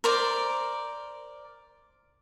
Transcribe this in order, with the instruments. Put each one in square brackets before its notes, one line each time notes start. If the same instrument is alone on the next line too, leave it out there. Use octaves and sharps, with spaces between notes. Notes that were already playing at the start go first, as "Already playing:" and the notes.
[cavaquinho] A#4 C5 D5